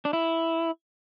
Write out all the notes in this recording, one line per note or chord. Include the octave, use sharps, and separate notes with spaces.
D4
E4